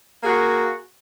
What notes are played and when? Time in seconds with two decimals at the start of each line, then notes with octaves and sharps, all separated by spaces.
0.23 A#3 F#4 G#4